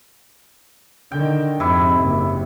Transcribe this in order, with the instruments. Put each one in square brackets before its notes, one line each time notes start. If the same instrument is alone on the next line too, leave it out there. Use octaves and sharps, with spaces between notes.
[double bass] D3 D#3 [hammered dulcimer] G5
[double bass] F2 G#2 [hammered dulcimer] C3 E4
[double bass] F#1